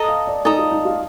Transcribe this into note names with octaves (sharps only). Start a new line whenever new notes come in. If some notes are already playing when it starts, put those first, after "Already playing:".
Already playing: A4 D#5 A#5 D#6
F5
D5
D#4 A4 D#5 A#5 D#6
F4
D#4
F4